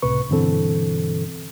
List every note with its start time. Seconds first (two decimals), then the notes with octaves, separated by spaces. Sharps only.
0.02 C#2 A2 C3 B4 C#6
0.29 G2 B2 D3 E3 C4 A4